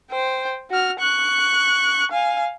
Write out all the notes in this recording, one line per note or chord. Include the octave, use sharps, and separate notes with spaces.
C5 G5
F#4 F6
C#6 F#6
F5 G#5